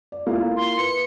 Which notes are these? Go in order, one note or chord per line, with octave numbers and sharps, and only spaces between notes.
D5
A#3 E4 F4
C6
B4 C#7